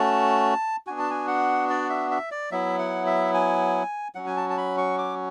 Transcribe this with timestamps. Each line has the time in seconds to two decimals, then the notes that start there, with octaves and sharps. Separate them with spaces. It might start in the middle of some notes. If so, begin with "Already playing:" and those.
Already playing: A3 C#4 F#4 A5
0.87 B3 D4 F#4 G#5
0.99 A5
1.10 G#5
1.28 F#5
1.70 D5
1.90 E5
2.11 E5
2.31 D5
2.52 F#3 B3 E4 E5
2.78 F#5
3.06 E5
3.34 G#5
4.15 F#3 C#4 F#4 F#5
4.26 G#5
4.37 A5
4.50 A5
4.57 B5
4.77 C#6
4.98 D6